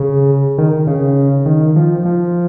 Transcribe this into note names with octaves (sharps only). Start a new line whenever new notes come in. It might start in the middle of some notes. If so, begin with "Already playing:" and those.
Already playing: C#3
D#3
C#3
D#3
F3
F3